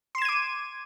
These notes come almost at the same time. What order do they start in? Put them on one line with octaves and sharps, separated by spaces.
C6 E7 G#6 D#7 D6